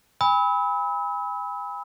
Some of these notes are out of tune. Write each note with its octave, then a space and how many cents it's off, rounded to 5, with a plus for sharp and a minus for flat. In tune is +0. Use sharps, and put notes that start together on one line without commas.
G#5 -40 B5 +0 E6 -40